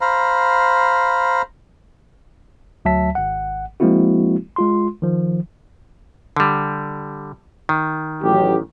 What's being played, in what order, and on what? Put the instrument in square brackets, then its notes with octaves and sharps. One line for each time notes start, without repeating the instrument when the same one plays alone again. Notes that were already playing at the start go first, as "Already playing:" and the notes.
[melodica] C5 F5 A#5 B5
[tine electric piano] D2 F#3 E5 A5 B6
G#1 F#5
F3 G#3 A#3 C4 E4 F#4
G#3 F4 C6
D#3 F3
[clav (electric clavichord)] D3 G3
D#3
[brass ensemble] A1 F#3 G4